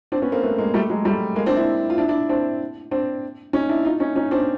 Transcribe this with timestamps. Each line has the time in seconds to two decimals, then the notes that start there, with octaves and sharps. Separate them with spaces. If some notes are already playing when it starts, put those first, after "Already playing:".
0.12 C4 D4
0.22 B3 C#4
0.32 A#3 C4
0.43 A3 B3
0.58 G#3 A#3
0.74 G3 A3
0.89 F#3 G#3
1.05 G3 A3
1.36 G#3 A#3
1.46 C4 D4
1.57 D4 E4
1.90 F4
1.98 D4 E4
2.08 D4 E4
2.29 C4 D4
2.91 C4 D4
3.53 C#4 D#4
3.69 D4 E4
3.85 D#4 F4
4.00 C#4 D#4
4.16 C#4 D#4
4.31 C4 D4